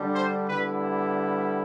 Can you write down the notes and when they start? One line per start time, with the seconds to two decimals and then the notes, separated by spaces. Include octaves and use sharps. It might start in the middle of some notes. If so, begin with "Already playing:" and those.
Already playing: D3 G3 D4
0.14 C5
0.49 D3 G3 B3 E4 B4